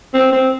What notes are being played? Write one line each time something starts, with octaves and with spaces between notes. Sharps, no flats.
C4
C4